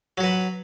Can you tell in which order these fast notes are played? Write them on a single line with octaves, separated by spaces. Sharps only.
F#3 F#4 B4